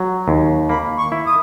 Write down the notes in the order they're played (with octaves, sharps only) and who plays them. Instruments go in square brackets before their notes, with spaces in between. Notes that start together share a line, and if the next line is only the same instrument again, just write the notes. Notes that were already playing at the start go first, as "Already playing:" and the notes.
Already playing: [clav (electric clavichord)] F#3
D#2
[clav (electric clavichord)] A#3 [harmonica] B5
[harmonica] C#6
[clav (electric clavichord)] E4
[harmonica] D#6